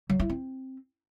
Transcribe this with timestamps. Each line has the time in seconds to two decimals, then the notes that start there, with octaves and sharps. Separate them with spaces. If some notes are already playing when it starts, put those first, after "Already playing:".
0.10 F#3
0.19 E4
0.29 C4